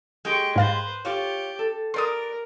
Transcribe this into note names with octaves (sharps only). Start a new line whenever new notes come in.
G#3 G4 G5 C#6
G#2 B4 C5 F5 A6
F4 G4 C#5
A4
A#4 B4 D5 C6 D#6